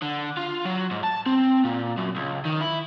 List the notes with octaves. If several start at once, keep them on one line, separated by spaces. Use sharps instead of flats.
D3
F4
F#3
G#2
A5
C4
A#2
F#2
C#2
D#3
E4